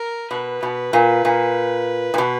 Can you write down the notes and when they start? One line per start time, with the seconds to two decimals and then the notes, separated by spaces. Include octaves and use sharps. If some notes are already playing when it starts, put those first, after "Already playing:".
Already playing: A#4
0.31 B2 B4
0.63 B2
0.93 A#2
1.25 A#2
2.14 A#2
2.18 B2